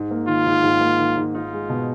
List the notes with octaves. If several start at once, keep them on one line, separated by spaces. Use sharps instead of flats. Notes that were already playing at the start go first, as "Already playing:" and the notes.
Already playing: G#2
A#3
D#3 F4
G#2
G#2
A#3
D#3
G#2
D#4 F4
G#3
B2